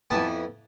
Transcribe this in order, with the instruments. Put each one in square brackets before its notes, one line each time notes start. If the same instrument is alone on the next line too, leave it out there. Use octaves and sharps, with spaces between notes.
[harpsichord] F2 E3 B3 A5